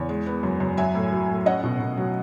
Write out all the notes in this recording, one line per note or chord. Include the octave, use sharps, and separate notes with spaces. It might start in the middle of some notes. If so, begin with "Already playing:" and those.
Already playing: E2 C#5
G#3
B3
F#2
F#2
F#3 E5 G#5
A2
F#3
A2
C#4 D#5 F#5
B2
B2
F#3